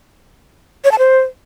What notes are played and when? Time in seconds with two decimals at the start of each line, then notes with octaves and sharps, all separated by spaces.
0.84 C#5
0.92 A5
0.99 C5